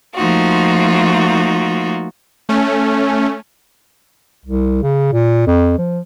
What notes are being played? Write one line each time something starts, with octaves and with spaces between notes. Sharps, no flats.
F3 A3 A#3 D#4 F4 F#4
A3 C#4
C2
C#3
A#2
F2
F3